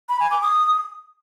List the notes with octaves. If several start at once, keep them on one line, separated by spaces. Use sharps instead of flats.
B5
G#5
D6
D#6